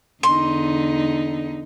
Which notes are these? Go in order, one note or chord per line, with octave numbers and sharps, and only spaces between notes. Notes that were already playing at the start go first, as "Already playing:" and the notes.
E2 D3 D#4 C6